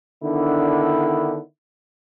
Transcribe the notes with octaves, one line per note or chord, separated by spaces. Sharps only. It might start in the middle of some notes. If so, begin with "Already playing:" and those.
D3 D#3 B3 D4 E4